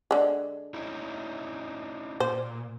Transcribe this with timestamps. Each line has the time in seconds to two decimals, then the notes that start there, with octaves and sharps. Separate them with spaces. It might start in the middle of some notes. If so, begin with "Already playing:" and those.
0.11 D3 G#3
0.74 C#4 D#4 E4
2.20 A#2 C5